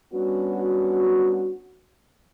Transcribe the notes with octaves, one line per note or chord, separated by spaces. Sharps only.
G3 B3 C#4 D4 F#4